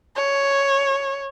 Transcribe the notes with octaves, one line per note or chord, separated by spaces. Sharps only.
C#5